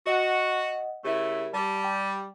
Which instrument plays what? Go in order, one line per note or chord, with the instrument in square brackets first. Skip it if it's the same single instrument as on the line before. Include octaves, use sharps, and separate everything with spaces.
[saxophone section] F#4 [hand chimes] D#5 F#5
[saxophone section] C#3 A3 E4 [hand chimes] G4 A#4
[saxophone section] G3 [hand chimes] A5
[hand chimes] G5